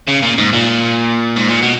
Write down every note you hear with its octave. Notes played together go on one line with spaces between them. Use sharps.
C#3
A#2
G#2
A#2
G#2
A#2
B2